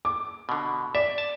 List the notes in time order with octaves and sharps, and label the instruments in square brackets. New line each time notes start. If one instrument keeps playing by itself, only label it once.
[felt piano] D6
[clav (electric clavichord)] B2 D3
[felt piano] D5 [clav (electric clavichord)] E5
[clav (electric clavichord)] A5